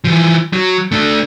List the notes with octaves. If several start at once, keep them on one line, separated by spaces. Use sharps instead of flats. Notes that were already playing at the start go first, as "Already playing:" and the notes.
E3 F3
F#3
A3 D4